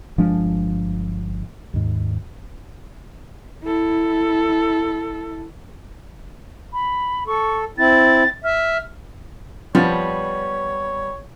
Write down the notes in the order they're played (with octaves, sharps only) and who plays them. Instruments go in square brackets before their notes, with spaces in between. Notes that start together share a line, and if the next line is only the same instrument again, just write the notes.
[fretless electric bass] G1 F3 G#3 D4
D#2 G#2
[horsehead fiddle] E4 A4
[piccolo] B5
[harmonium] A4 [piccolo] C#6
[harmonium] C4 E4 [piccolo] A6
[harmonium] E5 [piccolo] F6
[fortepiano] F3 [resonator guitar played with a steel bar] G3 B3 [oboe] C#5